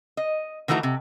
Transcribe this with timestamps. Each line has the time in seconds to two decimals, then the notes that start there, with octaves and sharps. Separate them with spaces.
0.17 D#5
0.68 D#3 E3 A3 F#4 A#5
0.83 C3